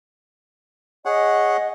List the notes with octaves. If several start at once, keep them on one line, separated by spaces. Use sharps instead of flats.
G#4 C#5 D#5 F#5